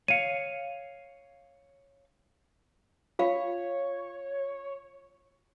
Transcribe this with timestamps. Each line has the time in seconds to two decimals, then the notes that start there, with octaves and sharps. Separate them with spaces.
0.08 C#5 F5 C#7 D#7
3.19 F4 C#5 F5